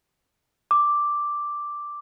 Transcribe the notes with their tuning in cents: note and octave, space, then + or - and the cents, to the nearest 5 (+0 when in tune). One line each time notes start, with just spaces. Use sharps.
D6 +0